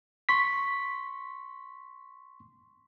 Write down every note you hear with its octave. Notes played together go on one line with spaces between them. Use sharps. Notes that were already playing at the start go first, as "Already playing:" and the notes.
C6 C#6 B6